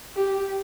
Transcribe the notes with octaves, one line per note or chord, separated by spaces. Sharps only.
G4